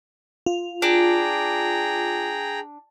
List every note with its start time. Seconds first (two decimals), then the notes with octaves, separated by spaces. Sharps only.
0.46 F4
0.82 D4 G#4 G5 A#5